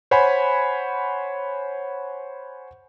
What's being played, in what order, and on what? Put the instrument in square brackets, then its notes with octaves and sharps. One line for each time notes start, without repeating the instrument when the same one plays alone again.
[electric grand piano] C5 C#5 F#5 G#5 B5